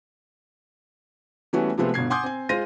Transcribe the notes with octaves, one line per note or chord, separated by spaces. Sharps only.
E3 G3 A3 B3 C#4 F#4
C3 F3 G#3 A3 B3 C4
G1 B2 G#6 C7
F#5 G#5 C6 D6 D#6 G6
C4 G#5
G#3 F4 C5 F5 A#6 D#7